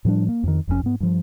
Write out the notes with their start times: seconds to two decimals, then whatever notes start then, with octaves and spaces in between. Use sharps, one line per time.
0.05 A2 F3 G3 D4
0.29 A#3
0.43 F2 D#3
0.68 F1 F2 C3 C#4
0.83 G#2 B3
1.00 G2 F3